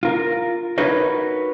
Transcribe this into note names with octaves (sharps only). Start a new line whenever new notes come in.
F4 A#4
D#4 F#4 A#4 B4 C#5 D#5